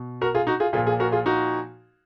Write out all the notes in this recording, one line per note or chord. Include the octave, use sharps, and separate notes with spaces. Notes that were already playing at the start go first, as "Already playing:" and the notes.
Already playing: B2
F#4 A#4
F4 G#4
D#4 F#4
F4 G#4
A#2 F3 F4 G#4
F4 G#4
F#4 A#4
F4 G#4
D#4 F#4